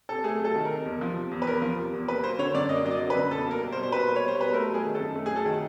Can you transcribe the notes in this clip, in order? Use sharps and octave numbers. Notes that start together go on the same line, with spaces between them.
C3 A4
A3 G#4
F#3
A4
D#3
A#4
C3
E2
F3
C3
E2
B4
E2 A#4
F3
C3
E2
A#3 B4
F#3 C5
D3 C#5
F#2 D5
A#3 D#5
F#3 D#5
D5
D3
B4
F#2
B2 A4
A#3 A#4
G3
C5
B2
C5
B2 B4
A#3
C#5
G3
C5
B2 B4
A3 A#4
F#3
G#4
D#3
A4
F#2
A3
G#4
F#3
A4
D#3